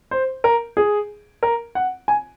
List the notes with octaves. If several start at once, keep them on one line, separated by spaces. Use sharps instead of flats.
C5
A#4
G#4
A#4
F#5
G#5